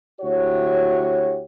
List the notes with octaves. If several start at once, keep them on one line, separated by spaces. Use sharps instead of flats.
D2 E4 F#4 G4 C#5